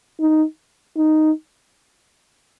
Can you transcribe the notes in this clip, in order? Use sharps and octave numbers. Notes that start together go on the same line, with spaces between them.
D#4
D#4